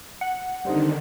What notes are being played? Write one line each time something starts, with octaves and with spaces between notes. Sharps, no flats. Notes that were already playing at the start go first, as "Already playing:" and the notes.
F#5
D3 D#3 G3 C4 D#4